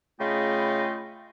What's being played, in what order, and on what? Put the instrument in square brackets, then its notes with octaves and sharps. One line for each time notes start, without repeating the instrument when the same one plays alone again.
[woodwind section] C#3 A3 F4 D#5 G5 B5